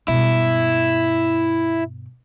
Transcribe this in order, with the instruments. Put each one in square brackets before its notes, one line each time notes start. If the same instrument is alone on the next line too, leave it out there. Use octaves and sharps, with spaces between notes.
[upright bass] G2 B2 [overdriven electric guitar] E4